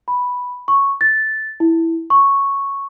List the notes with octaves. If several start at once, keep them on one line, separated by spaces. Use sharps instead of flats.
B5
C#6
A6
E4
C#6